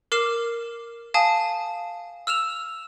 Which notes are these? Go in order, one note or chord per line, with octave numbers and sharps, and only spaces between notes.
A#4 D6 F6 C7 E7
F5 G#5 A5 D#6
E6 F6 E7 F7